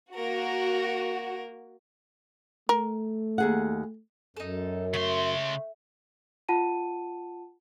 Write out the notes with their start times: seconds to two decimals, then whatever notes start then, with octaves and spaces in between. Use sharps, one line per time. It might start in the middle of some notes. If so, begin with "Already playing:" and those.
0.15 A#3 F#4 A#4
2.69 A3 A#4
3.38 D#2 G#4 F#5
4.37 F#2 D#4 A4
4.94 C#3 A3 C6
6.49 F4 F#5 A5 D#7